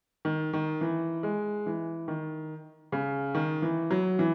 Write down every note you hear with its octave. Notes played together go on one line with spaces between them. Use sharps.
D#3
D#3
E3
G#3
E3
D#3
C#3
D#3
E3
F#3
E3